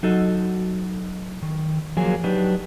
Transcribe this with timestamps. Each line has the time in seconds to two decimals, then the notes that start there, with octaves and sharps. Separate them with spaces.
0.03 F#3 D#4 F#4 A4 D#5
1.42 D#3
1.97 F3 F#3 A#3 G#4 G#5
2.24 F#3 D4 D#4 G4 B4